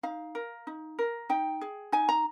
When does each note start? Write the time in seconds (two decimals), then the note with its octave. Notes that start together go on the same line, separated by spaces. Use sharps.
0.03 D#4 F5
0.35 A#4
0.67 D#4
0.99 A#4
1.29 D#4 G5
1.61 G#4
1.92 D#4 G#5
2.09 A#5